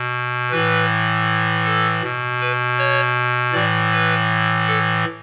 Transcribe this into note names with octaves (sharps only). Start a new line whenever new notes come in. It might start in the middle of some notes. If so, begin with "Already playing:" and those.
Already playing: B2
A2 E3 B4
A4
B2
B4
C#5
A2 E3 D5
B4
A4